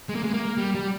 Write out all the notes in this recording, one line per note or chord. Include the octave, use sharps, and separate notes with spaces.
G#3
A#3
G#3
A#3
G3
G3